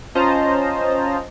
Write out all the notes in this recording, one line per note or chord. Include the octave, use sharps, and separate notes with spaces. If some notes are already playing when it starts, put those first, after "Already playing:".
C#4 F4 C5 D#5 A5 A#5